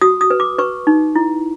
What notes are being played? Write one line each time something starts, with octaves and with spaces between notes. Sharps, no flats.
F#4 D#6
D#6
B4
D6
B4 C#6
D#4
E4